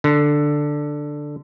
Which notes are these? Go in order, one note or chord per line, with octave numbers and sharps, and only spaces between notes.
D3